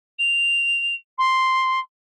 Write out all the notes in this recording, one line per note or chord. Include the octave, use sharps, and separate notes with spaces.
F7
C6